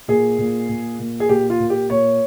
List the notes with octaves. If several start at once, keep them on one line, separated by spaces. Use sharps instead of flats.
A#2 G#4
A#2
A#2
A#2
G#4
A#2 G4
F4
A#2
G4
A#2 C#5